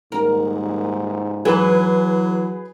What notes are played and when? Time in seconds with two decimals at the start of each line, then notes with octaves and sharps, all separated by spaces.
0.12 D#1 G#2 A#4
1.45 E3 F#3 G#4 B4